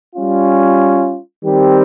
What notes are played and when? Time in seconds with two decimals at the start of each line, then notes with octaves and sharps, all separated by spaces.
0.15 G3 C#4 F4
1.44 D#3 G3 C4 G4